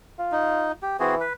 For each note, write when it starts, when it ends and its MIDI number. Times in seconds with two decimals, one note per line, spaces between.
0.19 0.72 65
0.32 0.72 63
0.82 0.97 67
1.00 1.22 52
1.00 1.15 60
1.00 1.15 66
1.00 1.15 68
1.20 1.33 71